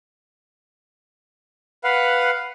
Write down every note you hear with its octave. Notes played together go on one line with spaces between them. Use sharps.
B4 F5 F#5